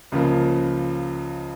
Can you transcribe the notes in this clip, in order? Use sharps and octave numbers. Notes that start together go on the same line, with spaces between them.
C#2 C#3 F3 A#3